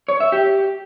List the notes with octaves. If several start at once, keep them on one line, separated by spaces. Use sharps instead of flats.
C#5
E5
G4